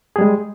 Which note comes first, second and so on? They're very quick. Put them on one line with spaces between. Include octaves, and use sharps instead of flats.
G#4 G3 G#3